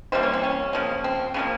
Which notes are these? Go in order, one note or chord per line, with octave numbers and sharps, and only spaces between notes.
C3 E3 G3 A#3 C5
C#4
C4
C#4
C#3 F3 A#3
C4
C#3 F3 A#3 C#4